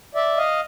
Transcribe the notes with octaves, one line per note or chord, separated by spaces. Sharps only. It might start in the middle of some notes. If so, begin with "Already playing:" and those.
D5 E5
D#5 F5